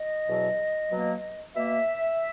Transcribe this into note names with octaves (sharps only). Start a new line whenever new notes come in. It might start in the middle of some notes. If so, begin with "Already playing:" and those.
Already playing: D#5
E2 B2 F#3
B2 F#3 A#3
B2 A#3 E5